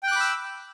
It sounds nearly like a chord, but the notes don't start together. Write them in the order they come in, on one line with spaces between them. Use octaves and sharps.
G5 F#6 D6 B5 E6